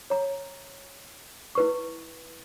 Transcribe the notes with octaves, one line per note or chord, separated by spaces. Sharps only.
C#5 A#5
E4 B4 C#6